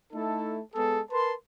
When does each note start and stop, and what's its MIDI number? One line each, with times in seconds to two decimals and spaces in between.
0.13 0.59 57
0.13 0.59 63
0.13 0.59 64
0.13 0.59 69
0.74 1.00 56
0.74 1.00 59
0.74 1.00 68
0.74 1.00 69
1.11 1.34 70
1.11 1.34 71
1.11 1.34 81
1.11 1.34 84